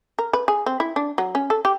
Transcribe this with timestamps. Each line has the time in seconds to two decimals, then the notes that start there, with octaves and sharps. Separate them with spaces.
0.19 A#4
0.33 B4
0.48 G#4
0.66 C4
0.80 E4
0.96 D4
1.18 F#3
1.35 C#4
1.50 A4
1.65 G4